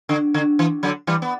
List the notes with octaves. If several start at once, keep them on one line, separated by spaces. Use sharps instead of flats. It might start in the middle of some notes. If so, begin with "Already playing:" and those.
D3
D3
E3
D3 F#3
E3 G3
B3